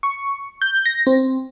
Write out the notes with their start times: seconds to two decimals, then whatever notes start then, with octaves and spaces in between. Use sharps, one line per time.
0.03 C#6
0.62 G6
0.86 A#6
1.07 C4